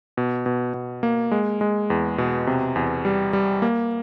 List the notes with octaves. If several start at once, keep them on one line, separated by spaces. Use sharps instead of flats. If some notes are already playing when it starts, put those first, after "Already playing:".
B2
B2
B2
A#3
G#3
G#3
E2
B2
C3
E2
G3
G3
A#3